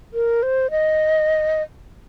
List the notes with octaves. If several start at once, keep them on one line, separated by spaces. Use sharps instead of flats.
A#4
C5
D#5